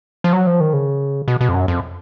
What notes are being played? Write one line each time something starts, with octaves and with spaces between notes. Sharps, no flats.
F3
F#3
F3
D#3
C#3
B2
B2
F2
F#2
F2